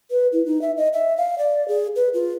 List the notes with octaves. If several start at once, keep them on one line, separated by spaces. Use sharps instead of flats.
B4
E4
D#4
E5
D#5
E5
F5
D5
G#4
B4
F4